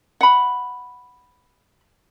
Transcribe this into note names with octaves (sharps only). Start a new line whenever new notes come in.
F#5 B5